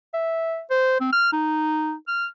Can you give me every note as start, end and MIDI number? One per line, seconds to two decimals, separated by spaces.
0.14 0.61 76
0.70 0.99 72
1.00 1.08 60
1.13 1.32 89
1.33 1.93 63
2.08 2.26 89